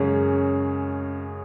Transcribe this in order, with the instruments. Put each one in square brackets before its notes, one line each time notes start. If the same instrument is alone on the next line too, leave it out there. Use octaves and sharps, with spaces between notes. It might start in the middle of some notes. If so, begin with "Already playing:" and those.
Already playing: [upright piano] F#2 C#3 G#3 C#4